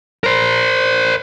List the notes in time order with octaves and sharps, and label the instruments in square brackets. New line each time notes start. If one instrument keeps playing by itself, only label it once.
[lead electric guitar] A#4 C5